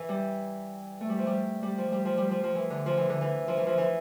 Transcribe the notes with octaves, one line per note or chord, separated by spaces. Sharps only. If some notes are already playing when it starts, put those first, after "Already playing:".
Already playing: E3
G3
A3
G3
F3
G3
G3
F3
G3
F3
G3
F3
F3
E3
D3
F3
E3
D3
E3
F3
E3
F3
E3